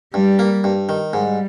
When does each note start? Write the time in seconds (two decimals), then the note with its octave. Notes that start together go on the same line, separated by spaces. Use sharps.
0.14 G2 G3
0.39 A#3
0.64 G2
0.89 D#3
1.13 G#2 G3